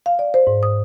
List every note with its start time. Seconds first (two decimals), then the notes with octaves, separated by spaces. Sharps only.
0.06 F5
0.19 D5
0.34 C5
0.47 G#2
0.63 D#6